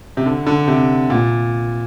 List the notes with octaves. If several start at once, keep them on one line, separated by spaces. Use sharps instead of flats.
C3
D3
D3
C3
A#2